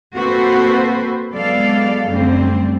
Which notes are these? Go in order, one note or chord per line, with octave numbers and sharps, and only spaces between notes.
A#3 C4 F#4 A4 B4 C5
F#3 G#3 B3 A4 D5 F5
F#2 D3 G3 A3 C4